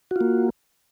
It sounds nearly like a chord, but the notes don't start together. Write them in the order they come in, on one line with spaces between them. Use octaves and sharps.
F#4 F4 A#3